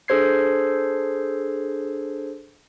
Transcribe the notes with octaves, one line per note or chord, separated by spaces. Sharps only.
D4 G#4 A4 C5 G#6 C7